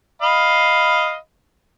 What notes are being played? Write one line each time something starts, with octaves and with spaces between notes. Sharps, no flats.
D#5 F5 B5